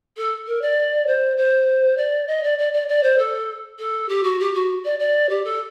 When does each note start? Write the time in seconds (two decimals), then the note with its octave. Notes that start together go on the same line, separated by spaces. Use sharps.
0.17 A4
0.47 A#4
0.61 D5
1.07 C5
1.37 C5
1.97 D5
2.27 D#5
2.43 D5
2.58 D5
2.73 D5
2.88 D5
3.03 C5
3.18 A4
3.79 A4
4.08 G4
4.23 F#4
4.39 G4
4.54 F#4
4.85 D5
4.99 D5
5.29 G4
5.44 A4